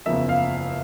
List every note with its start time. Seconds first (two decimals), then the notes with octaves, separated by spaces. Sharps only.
0.06 F#1 E2 C#3 F3 A#3 E5
0.29 F5